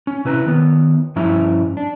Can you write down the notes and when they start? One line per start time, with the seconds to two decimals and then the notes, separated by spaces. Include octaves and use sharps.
0.07 C#4
0.25 C3 E4 B4 G#5 A#5
0.46 D#3 B3
1.16 G2 F3 C#4 E4 E5 A#5
1.77 D4